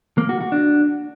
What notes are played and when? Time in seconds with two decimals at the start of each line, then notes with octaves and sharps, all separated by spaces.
0.18 A#3
0.29 F#4
0.41 F#4
0.52 D4